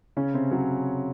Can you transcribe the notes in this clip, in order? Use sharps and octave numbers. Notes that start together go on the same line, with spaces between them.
C#3 C#4
C3 C4
F#3 F#4